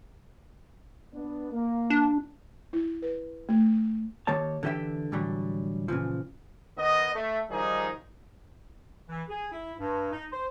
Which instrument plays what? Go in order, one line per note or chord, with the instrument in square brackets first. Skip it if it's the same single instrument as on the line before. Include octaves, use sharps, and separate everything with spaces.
[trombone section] B3 D4
A#3
[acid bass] D4
[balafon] E4
B4
A3
[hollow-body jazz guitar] D#3 A#3 G4 C#5 A5
D3 E3 G4 D#5 E5 G5
A2 D3 E3 F#3 G3
A#2 C#3 E3 F3
[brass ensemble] D#3 B3 D#5
A3
D#3 F3 G3 D#4 G#4
[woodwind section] E3
G#4
E4
G2
D#4
C5